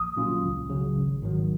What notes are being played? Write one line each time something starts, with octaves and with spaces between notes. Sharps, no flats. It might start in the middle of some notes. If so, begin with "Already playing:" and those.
Already playing: A#1 D#6
A#2 F#3 C#4 F4
C#2
C#3 F#3
G#1
G#2 D#3 F#3